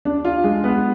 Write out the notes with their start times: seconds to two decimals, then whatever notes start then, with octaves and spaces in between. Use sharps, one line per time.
0.05 D4
0.25 F4
0.44 G#3
0.64 B3